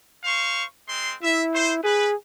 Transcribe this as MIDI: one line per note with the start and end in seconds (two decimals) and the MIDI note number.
0.24 0.64 72
0.24 0.64 77
0.24 0.64 85
0.88 1.14 56
0.88 1.14 60
0.88 1.14 84
1.23 1.79 64
1.23 1.41 76
1.54 1.72 72
1.83 2.15 68
1.83 2.08 71